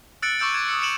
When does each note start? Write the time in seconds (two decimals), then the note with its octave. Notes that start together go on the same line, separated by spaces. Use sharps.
0.22 E6 F#6 A6 C#7 D7 F#7
0.39 C#6 D6 E6 G6 D7
0.53 D6 G#6 A6
0.68 D#6 E6 C#7
0.82 C#7 D7 E7 F#7